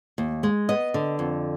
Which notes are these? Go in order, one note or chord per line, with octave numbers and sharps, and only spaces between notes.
D#2
G#3
B3 D#5
D3
F2